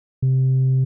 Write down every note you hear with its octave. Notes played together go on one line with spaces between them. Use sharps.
C3